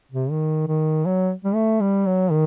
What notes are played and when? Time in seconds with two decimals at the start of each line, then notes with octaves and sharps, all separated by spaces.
0.12 C3
0.31 D#3
0.67 D#3
1.06 F#3
1.44 G3
1.55 A3
1.81 G3
2.06 F#3
2.31 D#3